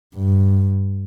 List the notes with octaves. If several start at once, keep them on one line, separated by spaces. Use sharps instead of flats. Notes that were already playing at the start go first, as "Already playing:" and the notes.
G2